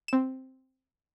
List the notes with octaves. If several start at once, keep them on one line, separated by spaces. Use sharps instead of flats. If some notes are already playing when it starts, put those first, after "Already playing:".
C4 E7